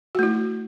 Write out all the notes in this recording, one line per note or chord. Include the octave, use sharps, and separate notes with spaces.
A3 E4 F#4